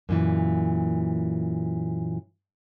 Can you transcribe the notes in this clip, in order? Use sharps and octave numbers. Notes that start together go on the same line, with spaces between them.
F#2 A#2 E3